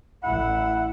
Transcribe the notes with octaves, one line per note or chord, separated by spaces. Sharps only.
A1 E4 F#5